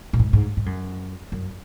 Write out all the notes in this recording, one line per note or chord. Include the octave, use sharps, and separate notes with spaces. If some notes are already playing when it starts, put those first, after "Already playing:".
A#2
G#2
G#2
G#2
F#2
F#2